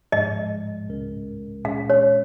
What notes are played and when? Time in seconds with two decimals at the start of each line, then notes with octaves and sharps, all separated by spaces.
0.12 G#2 F3 G#3 D#5
0.88 C#2 C#3 G#3 C#4 A#4
1.64 A#2 G#3 C#4 G#4 F5
1.90 C#5